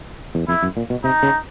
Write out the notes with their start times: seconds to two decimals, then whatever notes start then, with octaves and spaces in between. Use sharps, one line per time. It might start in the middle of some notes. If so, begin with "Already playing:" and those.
0.35 E2
0.48 F2 E4
0.62 F#2
0.77 A#2
0.90 B2
1.04 C3 D#4
1.23 C#3